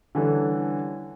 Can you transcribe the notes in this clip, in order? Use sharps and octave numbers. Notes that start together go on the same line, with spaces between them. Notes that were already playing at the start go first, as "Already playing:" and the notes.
D3 E3 G3 C#4 A4